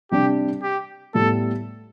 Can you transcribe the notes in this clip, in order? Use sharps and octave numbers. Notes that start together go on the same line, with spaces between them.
C3 G3 D4 G4
G4
A2 G3 B3 A4